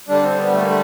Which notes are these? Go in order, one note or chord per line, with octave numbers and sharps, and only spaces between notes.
D3 G3 D4
C4
B3
A3
A#3
A3